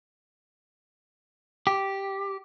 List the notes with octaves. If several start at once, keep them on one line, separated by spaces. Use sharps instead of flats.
G4